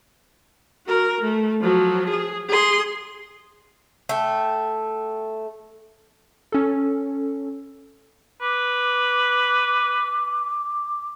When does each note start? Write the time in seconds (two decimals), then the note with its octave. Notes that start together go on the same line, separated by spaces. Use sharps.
0.87 F#4 A#4
1.21 A3
1.61 F3 F#3
2.09 G#4
2.49 G#4 C6
4.09 A3 G5
6.52 C#4 A4
8.42 B4 D6